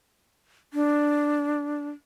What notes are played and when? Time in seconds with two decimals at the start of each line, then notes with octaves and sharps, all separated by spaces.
0.73 D4